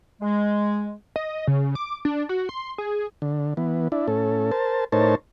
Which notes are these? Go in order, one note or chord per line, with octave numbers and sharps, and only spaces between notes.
G#3
D#5
C#3
D6
D4
F#4
C6
G#4
D3
E3 B3
D4 E4
A2 C#4 A4
A#4 C5 A5
A2 D#4 A#4 C5 C#5 A5